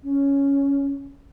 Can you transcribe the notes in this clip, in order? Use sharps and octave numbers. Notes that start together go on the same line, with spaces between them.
C#4